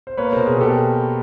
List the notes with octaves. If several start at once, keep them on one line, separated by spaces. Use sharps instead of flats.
C5
A#3 B4 C#5
B2 A#4 C5
G#4 A#4
B2 G4 A4